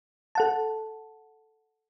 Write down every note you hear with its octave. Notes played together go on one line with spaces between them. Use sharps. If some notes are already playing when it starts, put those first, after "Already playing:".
A4 F#5 A5